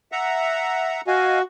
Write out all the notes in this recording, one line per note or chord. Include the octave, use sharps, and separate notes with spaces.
E5 F#5 A#5
F#4 D#5 F5 G#5